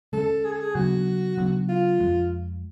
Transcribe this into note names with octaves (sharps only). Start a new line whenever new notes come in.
D3 G#3 C#4 A4
G#4
A4
G#4
C#3 F#3 B3 D4 F#4
C#3 F#3 B3 D4
F4
F2 F3 G#3